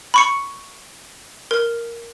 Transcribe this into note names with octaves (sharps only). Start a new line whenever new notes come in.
B5 C#6 C#7
A#4